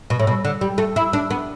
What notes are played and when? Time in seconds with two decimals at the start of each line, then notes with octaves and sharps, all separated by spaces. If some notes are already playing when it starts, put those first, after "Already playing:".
0.10 B2
0.19 A2
0.27 B2
0.45 D3
0.61 G3
0.78 A3
0.96 E4
1.13 D4
1.30 B3